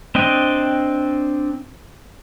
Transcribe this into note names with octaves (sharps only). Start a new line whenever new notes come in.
C4 D4 D#5 G5